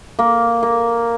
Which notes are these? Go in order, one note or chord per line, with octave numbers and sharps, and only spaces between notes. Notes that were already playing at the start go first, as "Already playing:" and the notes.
A#3
A#3